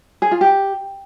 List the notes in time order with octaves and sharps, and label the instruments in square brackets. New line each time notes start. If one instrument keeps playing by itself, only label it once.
[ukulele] G#4
F4
G4